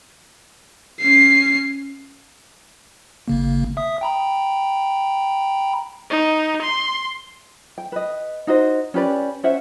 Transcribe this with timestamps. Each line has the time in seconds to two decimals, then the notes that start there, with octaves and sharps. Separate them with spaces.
1.00 C#4 C7
3.28 G#1 C#3 A#3
3.77 E5 D#6
4.01 G5 A#5 B5
6.10 D#4
6.63 C6
7.78 G5
7.92 B4 D#5
8.47 D#4 F#4 C5 D#5
8.94 C#4 G4 B4 D5
9.44 C#4 C5 E5 F#5